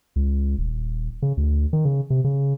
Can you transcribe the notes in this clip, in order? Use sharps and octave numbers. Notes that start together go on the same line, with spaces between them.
C#2
D#1
C#3
D2
D#3
C#3
C3
C#3